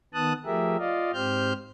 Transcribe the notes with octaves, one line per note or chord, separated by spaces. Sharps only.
D#3 B3 A5 D#6 F#6
F3 A3 G4 G#4 A#4 E5
F4 D5 D#5 F5
G#2 C4 G4 C5 F6 G6